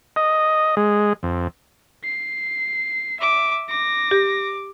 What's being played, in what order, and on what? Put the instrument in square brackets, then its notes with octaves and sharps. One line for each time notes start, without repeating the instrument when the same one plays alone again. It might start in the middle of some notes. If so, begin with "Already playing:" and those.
[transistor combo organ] D#5
G#3
F2
[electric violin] C7
[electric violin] E5 [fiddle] D6
[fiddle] D6 [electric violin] A#6
[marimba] G4